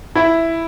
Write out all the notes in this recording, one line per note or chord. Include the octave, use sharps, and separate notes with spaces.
E4